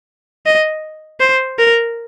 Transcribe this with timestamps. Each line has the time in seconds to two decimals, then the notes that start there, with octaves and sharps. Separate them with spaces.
0.46 D#5
1.20 C5
1.59 A#4